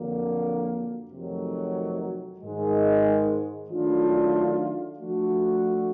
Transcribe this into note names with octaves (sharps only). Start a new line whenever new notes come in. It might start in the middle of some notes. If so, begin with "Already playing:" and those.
Already playing: F2 D3 F#3 A#3 D4
F2 C3 D#3 F#3 A3
G#2 D#3 G#3
D#3 F#3 A3 D4 F4
F3 A3 D4 F#4